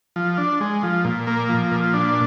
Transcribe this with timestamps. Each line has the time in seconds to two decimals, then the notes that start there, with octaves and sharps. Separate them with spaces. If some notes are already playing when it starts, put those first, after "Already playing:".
0.16 F3
0.38 D4
0.61 G#3
0.83 F3
1.05 A#2
1.27 A#3
1.49 F3
1.71 A#2
1.93 D4